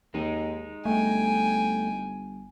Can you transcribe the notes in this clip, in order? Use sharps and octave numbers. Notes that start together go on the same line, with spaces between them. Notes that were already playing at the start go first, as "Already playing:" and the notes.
D#2 G#3 D#4
G1 A3 G5 G#5